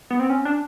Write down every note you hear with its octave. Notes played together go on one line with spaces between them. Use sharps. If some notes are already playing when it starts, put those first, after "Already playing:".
B3
C4
C#4
D4